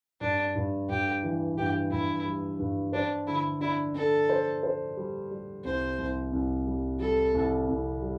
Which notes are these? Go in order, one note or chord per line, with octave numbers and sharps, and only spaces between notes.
G2 D4
G2
G2 G4
E3
G2 G4
G2 E4
G3
G2
D4 C5
D3 E4
D4 E4
D4 A4
C5
C5
G3
G3
C2 C5
C2
C2
G3
G3 A4
C2
C2
G3